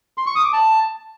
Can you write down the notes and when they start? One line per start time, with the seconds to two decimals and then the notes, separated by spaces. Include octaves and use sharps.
0.18 C6
0.26 C#6
0.35 D#6
0.44 D6
0.53 A5